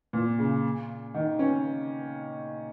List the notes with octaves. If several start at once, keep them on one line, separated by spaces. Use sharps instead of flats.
A#2
C#3
D#3
C#4